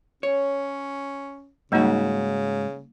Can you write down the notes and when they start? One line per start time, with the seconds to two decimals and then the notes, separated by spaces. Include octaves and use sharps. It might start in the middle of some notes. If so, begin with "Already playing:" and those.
0.23 C#4 C#5
1.72 G#2 C#3 G3 A#3 D#4 F#4